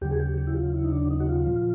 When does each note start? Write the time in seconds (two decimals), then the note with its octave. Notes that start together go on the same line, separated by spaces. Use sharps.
0.01 D#2 C#3 F#3 G4
0.11 G#4
0.19 G4
0.38 G4
0.47 E4
0.56 F4
0.74 E4
0.84 D#4
0.92 D4
1.10 D#4
1.20 F#4
1.29 F4
1.46 A#2 F3